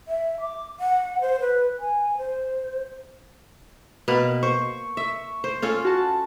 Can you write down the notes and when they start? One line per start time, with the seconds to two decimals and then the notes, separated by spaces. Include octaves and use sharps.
0.08 E5
0.41 D6
0.80 F#5
1.21 C5
1.41 B4
1.79 G#5
2.18 C5
4.08 B2 A#3 B4
4.43 C5 C#6
4.97 E5
5.44 C5
5.62 C#4 F4 A4
5.85 F#4 A5